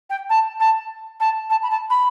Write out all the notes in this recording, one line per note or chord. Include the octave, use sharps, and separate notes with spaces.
G5
A5
A5
A5
A5
B5
A5
B5